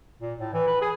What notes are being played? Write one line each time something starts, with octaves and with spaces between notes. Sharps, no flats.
A#2
A2
E3
B4
G#4